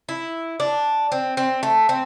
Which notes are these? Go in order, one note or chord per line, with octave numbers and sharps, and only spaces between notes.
E4
D4
C4
C4
A3
C4